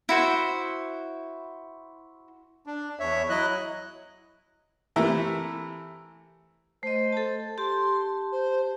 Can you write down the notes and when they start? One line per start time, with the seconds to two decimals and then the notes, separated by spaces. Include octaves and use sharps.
0.09 E4 F#4 C5
2.66 D4
3.00 E2 C#5 E5
3.29 F#3 E4 D#5 F#6
4.96 C3 E3 A3 E4 A#4
6.83 A3 C5 D#5
7.12 A4 A5
7.58 G4 A5 C6
8.32 C5